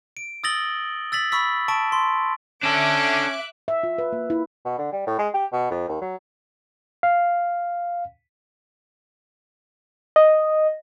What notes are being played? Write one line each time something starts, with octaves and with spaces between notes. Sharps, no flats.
D7
D#6 E6 A6 A#6 F#7 G7
E6 A6 B6 F#7
B5 C#6 E6 B6
A5 C#6 D7
C6
C#4 D4 A4 E5 D6 F#6
E5
F4
B4
A#3
E4
B2
D3
G3
A2
G#3
G4
B2
F2
D#2
F#3
F5
D#5